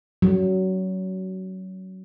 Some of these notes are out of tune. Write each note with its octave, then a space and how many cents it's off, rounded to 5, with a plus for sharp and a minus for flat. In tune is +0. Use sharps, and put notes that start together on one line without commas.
F#3 +20